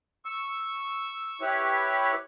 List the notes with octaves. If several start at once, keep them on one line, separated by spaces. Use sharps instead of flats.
C#6 E6
E4 G4 B4 C#5